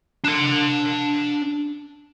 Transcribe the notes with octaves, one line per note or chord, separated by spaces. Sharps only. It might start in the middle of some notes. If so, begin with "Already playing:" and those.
D4 C6